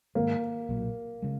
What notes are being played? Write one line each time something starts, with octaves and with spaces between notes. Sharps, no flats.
G#2 D#3 G#3 A#3
B1 A#2 F#3
C#3 G#3